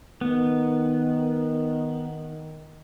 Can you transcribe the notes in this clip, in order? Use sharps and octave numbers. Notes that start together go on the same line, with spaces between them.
D#3 B3